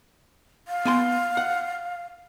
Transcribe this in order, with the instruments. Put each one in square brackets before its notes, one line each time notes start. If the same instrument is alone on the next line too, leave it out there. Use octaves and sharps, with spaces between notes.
[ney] F5
[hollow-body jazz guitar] B3 G#5 C6
F#5